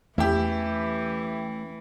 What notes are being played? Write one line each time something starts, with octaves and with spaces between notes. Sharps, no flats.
E2 E3 A3 C#4 E4 G4